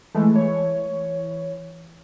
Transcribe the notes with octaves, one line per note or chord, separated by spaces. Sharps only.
E3 G#3 A3
E3 C#5